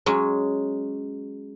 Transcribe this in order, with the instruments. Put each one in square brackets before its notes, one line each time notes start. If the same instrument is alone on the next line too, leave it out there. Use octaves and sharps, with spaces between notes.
[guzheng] F#3 G#3 C#4